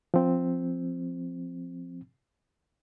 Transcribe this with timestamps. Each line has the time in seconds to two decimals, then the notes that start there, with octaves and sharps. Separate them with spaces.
0.14 F3 C4